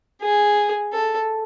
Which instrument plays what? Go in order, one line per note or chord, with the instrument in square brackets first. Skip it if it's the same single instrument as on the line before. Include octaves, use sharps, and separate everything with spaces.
[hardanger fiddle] G#4
A4